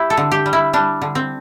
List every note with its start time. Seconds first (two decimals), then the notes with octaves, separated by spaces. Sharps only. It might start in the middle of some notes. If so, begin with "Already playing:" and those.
Already playing: E4 G4
0.10 A4
0.17 D3
0.32 G4
0.46 G3
0.53 E4
0.73 G3 D4
1.02 D3
1.15 C4